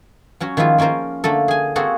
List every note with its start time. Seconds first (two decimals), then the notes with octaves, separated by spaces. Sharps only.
0.40 F#3 C#4 F#4
0.57 D#3 F3 G#3 E4 F4
0.78 A#3 C#4 F4 A#4 C5
1.24 D3 A3 A#3 A4
1.48 G#4 G#5
1.76 A#3 C4 F#4 G#4 A4